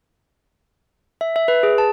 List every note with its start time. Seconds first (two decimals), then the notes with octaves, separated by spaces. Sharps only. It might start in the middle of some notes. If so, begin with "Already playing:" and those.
1.21 E5
1.36 E5
1.48 B4
1.63 G#4
1.78 A5